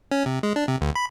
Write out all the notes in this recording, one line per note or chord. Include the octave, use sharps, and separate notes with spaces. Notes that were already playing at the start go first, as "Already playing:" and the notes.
C#4
C3
G#3
D4
C3
D2
B5